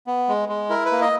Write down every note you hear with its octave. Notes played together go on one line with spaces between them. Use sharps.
B3
G#3
G#3
E4 A#4
B4
A#3
D#5